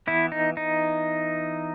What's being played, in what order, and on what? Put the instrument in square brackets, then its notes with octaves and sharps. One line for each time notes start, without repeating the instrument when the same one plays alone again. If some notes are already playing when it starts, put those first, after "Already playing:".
[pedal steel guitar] E3 B3 E4
D#4
D#4